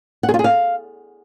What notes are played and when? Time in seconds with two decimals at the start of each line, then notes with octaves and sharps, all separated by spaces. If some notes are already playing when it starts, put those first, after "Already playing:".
0.23 F#5
0.29 G#4
0.34 F4
0.39 G#4
0.44 F5